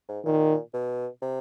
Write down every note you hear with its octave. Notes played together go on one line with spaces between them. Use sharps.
G#2
A#2 D#3
B2
C3